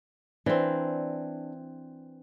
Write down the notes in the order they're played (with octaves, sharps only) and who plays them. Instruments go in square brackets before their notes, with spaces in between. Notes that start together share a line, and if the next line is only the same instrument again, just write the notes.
[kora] E3 C4 [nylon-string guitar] D4